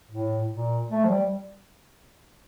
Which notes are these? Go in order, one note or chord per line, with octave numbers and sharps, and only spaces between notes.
A2
A#2
A3
F3
G3